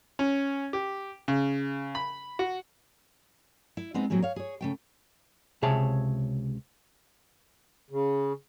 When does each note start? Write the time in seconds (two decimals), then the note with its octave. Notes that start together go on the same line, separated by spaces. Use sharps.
0.19 C#4
0.73 G4
1.28 C#3
1.95 B5
2.39 F#4
3.77 E4
3.94 G#3 B3 C4 D#4
4.10 A2 F#3 A#3 C4 G#4
4.22 C#5 F5
4.36 G#4 C#5
4.61 C#3 A3 G5
5.62 C#2 C3 G#4 C#5 E5 A5
7.91 C#3